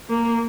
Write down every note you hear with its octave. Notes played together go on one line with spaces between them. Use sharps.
A#3